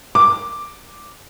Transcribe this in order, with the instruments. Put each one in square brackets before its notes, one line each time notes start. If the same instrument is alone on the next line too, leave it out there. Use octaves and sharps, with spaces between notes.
[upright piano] D6